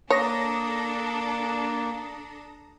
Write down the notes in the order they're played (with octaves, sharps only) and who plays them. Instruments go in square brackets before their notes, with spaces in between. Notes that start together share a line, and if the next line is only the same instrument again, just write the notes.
[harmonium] A#3 [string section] D4 A4 [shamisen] C#5 [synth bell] A#5 D#6 A#6